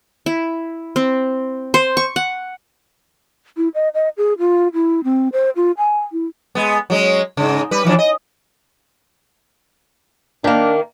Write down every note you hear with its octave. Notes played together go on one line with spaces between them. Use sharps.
E4
C4
C5
C#6
F#5
E4
D#5
D#5
G#4
F4
E4
C4
C5
F4
G#5
E4
G#3 B3
F#3 G#3 C#4
G#2 C#3
G3 B4
E3 F3 D4
D#5
D#3 A#3 D4